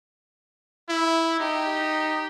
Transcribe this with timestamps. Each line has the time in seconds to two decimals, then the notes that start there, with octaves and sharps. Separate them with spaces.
0.89 E4
1.40 D#4 G4